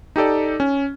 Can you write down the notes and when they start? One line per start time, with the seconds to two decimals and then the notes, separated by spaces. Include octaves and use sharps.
0.16 D#4 G4 A4 D5
0.60 C#4